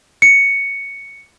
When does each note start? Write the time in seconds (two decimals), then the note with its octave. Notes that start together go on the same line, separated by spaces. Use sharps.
0.22 C#7